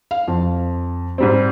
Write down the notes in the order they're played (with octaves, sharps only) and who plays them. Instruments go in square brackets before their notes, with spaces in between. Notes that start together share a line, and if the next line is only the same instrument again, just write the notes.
[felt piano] F5
F2
[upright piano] G#2 G3 C4